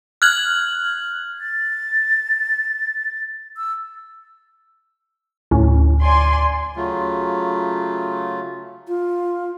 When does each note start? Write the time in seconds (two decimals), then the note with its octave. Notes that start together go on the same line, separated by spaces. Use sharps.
0.22 F6 F#6 G#6 F#7
1.39 A6
3.57 E6
5.51 D2 A2 C#4
6.01 D5 G#5 C6
6.76 C#3 F#3 A3 F4
8.88 F4